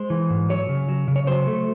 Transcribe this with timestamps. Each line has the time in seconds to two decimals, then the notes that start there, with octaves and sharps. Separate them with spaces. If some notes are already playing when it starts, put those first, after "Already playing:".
Already playing: G#3 C5
0.10 E3
0.30 G#2
0.50 F#3 C#5
0.69 C#3
0.89 F#3
1.08 C#3
1.16 C#5
1.27 F#3 C5
1.47 A3